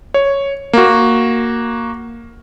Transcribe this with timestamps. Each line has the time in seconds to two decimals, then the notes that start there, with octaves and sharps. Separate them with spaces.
0.14 C#5
0.73 A#3 F#4